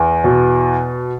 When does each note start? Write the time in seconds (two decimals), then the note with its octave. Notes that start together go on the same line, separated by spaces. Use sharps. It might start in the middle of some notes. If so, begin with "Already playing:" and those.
Already playing: E2
0.24 B2